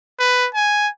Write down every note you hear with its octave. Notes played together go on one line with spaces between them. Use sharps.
B4
G#5